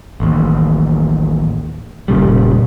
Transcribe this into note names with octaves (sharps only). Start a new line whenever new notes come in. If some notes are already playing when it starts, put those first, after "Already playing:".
A1 D#2
F1 A#2 C#3 G3